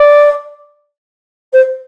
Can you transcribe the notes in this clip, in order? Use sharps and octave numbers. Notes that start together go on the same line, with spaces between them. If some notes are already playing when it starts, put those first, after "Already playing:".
Already playing: D5
C5